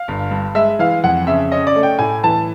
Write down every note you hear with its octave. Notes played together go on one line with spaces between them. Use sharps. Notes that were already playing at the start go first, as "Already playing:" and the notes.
Already playing: F5
G1
G2
G#3 E5
E3 F5
F2 F#5
C#3 E5
C#4 D#5
D5
A3
G5
A2 G#5
E3 A5